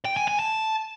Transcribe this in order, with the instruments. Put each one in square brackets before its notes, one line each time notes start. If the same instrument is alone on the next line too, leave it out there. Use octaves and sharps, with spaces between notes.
[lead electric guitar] G5
G#5
G#5
A5